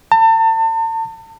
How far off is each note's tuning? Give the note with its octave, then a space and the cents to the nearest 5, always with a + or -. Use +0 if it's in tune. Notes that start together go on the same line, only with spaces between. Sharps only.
A5 +40